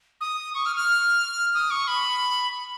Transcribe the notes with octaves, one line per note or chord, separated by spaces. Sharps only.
D#6
C#6
F6
F6
D#6
C#6
B5